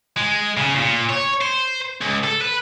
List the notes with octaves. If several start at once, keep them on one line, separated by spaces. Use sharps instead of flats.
G#3
C#3
A#2
C#5
C5
C#2
A4
B4